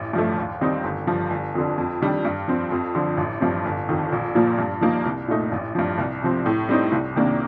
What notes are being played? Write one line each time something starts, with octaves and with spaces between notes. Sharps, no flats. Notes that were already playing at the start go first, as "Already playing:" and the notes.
Already playing: A1
G2 F3 A3
D#2
D#3 G3 C4 D#4
G1
G2 F3
G1
F2 D3
F2
D#3 G3 D4
G2
F3 C4
F2
D3 F3
A1
G2 F3 C4
G1
F2 D#3
A#1
A#2 F3 A#3
G2
F3 A#3 D#4
C2
A#2 A3 D#4
A1
G2 F3
C2
C3 F3 C4
A2
G3 C4 D#4
C2
C3 D#3 A#3 D4